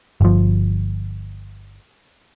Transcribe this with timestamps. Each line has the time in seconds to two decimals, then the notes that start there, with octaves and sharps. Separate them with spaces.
0.21 G1 F3